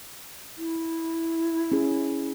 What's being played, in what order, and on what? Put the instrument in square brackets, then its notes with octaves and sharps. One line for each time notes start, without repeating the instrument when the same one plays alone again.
[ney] E4
[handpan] C#4 G#4